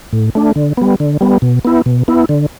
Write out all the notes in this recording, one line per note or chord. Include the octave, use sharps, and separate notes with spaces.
A2
A3 D4
D3
G3 B3
D3
G3 B3
B2
B3 E4
B2
B3 E4
D3